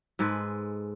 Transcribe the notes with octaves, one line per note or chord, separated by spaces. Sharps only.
G#2 G#3 A4 B4